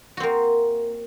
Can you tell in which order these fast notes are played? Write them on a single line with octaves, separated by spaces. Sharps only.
F#4 C4 A#3